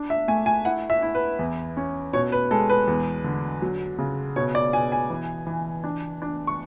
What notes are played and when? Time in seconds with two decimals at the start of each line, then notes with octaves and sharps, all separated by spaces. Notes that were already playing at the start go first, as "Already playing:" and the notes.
Already playing: D4
0.10 E5
0.28 A3 G#5
0.46 G#5
0.65 E4 F#5
0.90 E5
1.02 E4
1.15 B4
1.39 E2
1.77 C#4
2.13 B2 C#5
2.32 B4
2.51 G#3 A4
2.69 B4
2.88 E2
3.24 D3
3.62 F#3
3.98 C#3
4.36 B2 C#5
4.55 D5
4.73 B2 G#5
4.92 G#5
5.10 E3
5.47 E3
5.84 D4
6.22 D4
6.47 C#6